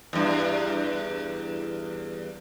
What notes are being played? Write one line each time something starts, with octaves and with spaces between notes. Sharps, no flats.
E2 G2